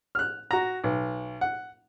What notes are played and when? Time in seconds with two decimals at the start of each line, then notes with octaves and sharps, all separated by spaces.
0.15 F6 F#6
0.51 F#4 A#5
0.84 B1
1.41 F#5